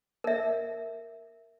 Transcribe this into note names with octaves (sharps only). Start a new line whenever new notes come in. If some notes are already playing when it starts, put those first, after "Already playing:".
A#4 E5